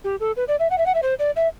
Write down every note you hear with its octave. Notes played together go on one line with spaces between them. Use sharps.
G4
A4
B4
D5
E5
F#5
E5
F#5
E5
C5
D5
E5